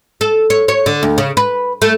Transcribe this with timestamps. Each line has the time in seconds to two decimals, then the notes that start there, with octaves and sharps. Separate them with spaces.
0.21 A4
0.50 C#5
0.68 C#5
0.86 D3
1.03 D2
1.18 C#3
1.37 B4
1.82 A3